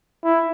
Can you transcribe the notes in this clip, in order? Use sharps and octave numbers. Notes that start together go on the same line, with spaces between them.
E4